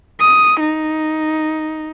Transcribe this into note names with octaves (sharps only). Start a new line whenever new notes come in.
D#6
D#4